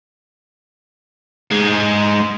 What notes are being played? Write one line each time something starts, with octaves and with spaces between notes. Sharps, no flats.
G#2 G#3